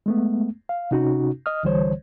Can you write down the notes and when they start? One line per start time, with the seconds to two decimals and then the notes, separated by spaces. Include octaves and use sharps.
0.06 G#3 A3 B3
0.69 F5
0.91 C3 C#4 D#4 F#4
1.46 D#5 D#6 F6
1.63 C2 D3 E3 G3 C5 C#5